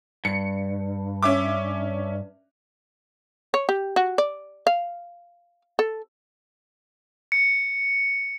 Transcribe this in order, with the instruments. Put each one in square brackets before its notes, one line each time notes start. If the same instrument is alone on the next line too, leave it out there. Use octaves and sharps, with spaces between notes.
[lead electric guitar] G2 [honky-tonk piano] C#7
[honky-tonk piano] C#4 E5 D6
[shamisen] C#5
G4
F#4
D5
F5
A4
[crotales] C#7